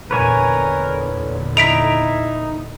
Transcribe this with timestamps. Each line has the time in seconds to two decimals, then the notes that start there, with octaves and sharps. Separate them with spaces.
0.11 E2 A#2 D3 A#4 B4 C#5 G#5
1.57 D#4 E4 B6 D7 F7